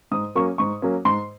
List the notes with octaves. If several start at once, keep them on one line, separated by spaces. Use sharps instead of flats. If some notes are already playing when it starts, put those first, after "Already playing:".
G#2 D#6
F#3 A#3 C#4 C#6
G#2 C#6
F#3 A#3 C#4
G#2 C6